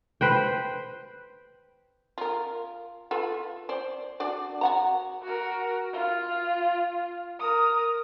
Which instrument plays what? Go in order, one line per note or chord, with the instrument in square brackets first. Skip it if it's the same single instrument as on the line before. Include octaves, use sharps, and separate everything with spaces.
[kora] B4 C5 G5
[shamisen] F4 A#4
F4 A4 B4
C5 D5
D4 F#4 D5
F#4 F#5 A#5
[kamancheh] F#4 A#4
F4
A#4 D#6